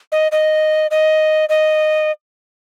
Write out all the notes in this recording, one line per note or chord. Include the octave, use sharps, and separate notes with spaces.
D#5
D#5
D#5
D#5